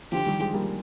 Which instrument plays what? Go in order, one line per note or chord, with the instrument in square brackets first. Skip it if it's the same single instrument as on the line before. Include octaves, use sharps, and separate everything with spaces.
[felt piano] D3 F3 [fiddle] G4
[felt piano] D#3 G3
F3 G#3
G3 A#3